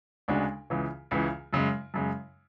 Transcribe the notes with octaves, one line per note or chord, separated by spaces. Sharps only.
D2 C#3 G#3 D4 F#4
C#2 C#3 E3
C#2 C#3 E3
F#2 C#3 G#3
F#2 C#3 G#3